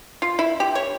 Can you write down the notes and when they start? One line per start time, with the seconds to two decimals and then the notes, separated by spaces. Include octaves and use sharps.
0.22 F4
0.39 E4
0.60 G4
0.75 C#5